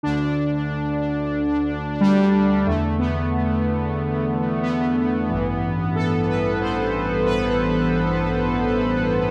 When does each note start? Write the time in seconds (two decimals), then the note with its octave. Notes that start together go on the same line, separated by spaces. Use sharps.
0.03 D2 D3 D4
2.00 G3
2.66 E2 D3 A3
2.99 B3
4.63 B3
5.29 A1 G2 E3
5.95 A4
6.27 B4
6.61 C5
7.26 B4